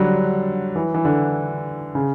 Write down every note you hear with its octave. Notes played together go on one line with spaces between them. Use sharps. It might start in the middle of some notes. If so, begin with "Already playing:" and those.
Already playing: D3 F#3 G3
E3
E3
D3
C#3